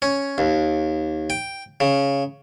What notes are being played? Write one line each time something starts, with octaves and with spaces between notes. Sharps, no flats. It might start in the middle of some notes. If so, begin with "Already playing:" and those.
C#4
D#2
G5
C#3